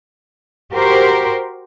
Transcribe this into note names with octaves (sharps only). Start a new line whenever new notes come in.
F#4 G4 A#4 C5